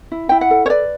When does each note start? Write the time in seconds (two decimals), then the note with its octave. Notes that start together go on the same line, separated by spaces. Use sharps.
0.12 E4
0.29 E4 G5
0.41 F#5
0.51 A4
0.66 C#5
0.70 B4 D5